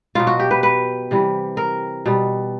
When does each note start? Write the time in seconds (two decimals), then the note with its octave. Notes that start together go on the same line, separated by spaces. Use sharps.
0.15 B2 F#3 F4
0.27 F#4
0.39 G4
0.51 B4
0.63 B4
1.11 C3 E3 G3
1.57 A#4
2.06 B2 G3